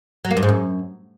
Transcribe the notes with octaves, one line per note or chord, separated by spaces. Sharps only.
F#3
A#3
G2
G#2
F#2